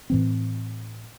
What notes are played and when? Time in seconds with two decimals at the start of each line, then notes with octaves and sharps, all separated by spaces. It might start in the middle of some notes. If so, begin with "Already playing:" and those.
0.10 A2 E3 C4